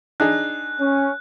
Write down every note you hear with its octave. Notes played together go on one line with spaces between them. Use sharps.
D4 D#4 G#4 F#6
C#4